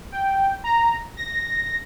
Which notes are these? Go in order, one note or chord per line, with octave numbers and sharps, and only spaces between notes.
G5
A#5
A#6